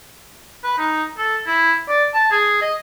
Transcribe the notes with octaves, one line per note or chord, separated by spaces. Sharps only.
B4
D#4
A4
E4
D5
A5
G#4
D#5